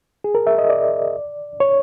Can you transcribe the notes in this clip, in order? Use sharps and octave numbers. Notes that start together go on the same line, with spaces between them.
G#4
A#4
E5
D#5
D5
C#5